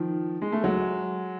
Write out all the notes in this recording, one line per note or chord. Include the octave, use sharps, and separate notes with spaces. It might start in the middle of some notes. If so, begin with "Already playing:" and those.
Already playing: D#3 F3
G#3
A3
F#3 G#3